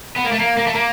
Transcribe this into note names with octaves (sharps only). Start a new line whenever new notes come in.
B3
A#3
A3
A#3
A#3
A3
A#3